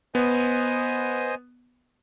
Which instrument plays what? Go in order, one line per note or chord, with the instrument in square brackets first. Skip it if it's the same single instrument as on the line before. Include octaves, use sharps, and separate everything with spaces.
[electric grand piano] B3 [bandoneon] C5 D#5 G#5